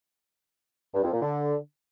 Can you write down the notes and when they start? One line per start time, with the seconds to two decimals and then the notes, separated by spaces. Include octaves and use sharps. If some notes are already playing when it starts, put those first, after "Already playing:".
0.94 G2
1.03 F2
1.13 A#2
1.22 D3